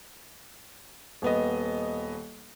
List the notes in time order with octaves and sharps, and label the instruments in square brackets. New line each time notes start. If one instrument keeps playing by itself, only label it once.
[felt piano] D#1 B3 D#5